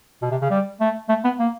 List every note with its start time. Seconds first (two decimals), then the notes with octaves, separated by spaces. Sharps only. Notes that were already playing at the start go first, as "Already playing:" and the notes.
0.22 B2
0.31 C3
0.41 C#3
0.50 G3
0.80 A3
1.09 A3
1.24 B3
1.39 A#3